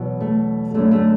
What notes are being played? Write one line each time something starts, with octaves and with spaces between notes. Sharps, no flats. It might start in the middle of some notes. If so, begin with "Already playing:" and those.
Already playing: E2 B2 F#3
A3
F#2 D3 F#3 A3
A3